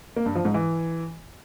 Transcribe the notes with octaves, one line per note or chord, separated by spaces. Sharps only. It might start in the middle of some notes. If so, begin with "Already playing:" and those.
A#3
G2
F3
G#2
E3